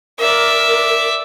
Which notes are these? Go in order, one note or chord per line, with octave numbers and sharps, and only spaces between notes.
A#4 D5 E5